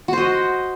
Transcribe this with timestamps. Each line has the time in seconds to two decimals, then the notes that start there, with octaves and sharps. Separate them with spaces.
0.08 F#4
0.13 C5
0.18 D#5